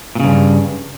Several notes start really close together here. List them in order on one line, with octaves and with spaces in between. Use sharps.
A#2 C#3 G2